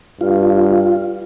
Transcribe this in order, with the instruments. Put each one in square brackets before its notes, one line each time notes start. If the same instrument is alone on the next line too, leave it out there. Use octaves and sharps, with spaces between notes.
[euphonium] G2 [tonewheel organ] F4